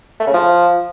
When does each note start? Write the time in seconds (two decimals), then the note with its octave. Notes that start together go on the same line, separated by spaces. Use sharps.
0.20 A3
0.27 C#3
0.34 F3